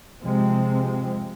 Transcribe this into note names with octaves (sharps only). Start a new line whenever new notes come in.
C3 F3 G#3 C4